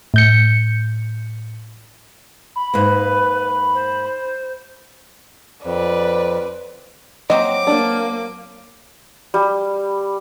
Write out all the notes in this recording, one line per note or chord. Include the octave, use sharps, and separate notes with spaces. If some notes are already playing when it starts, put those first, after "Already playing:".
A2 G6 C#7
B5
G#2 A#3 B4
C5
F2 B4 C5 D5
F#3 A#3 C4 D#5 D6
A#3 D4
G3